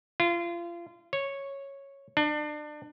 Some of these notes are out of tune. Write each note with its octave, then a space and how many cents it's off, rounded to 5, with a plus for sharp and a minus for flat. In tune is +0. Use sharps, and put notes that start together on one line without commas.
F4 -30
C#5 -5
D4 +30